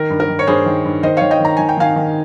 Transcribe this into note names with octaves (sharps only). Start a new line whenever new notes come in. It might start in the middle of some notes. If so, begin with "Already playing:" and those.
Already playing: D#3 A#4
G2
A#4
D#3
C#5
G2 G#4 C5
D#3
G2
D#3 C5 D#5
D#3 C#5 F5
D#5 G5
D#3 A#5
D#3 G#5
G5
D#3 F5 G#5
D#3